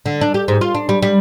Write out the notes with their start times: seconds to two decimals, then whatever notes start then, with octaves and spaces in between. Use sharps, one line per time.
0.06 D3
0.21 D4
0.34 G4
0.48 G#2
0.61 F4
0.75 D4
0.89 G3
1.02 G3